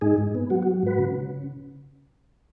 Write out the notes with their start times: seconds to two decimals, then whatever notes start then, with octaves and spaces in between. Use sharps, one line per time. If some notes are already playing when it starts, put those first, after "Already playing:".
0.01 G#2 D#4 G#4
0.18 G#2
0.35 B3
0.50 F#3 F#4
0.62 F#4
0.67 F#3
0.83 G#2 F#4 B4
0.99 C#3
1.15 C#3